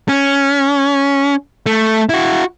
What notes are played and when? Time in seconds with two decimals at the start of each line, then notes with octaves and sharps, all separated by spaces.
0.09 C#4
1.66 A3
2.09 E4 F#4